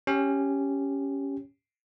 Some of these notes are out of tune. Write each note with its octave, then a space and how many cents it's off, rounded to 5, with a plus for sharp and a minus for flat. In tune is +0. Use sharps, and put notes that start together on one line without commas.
C#4 +0 G4 +0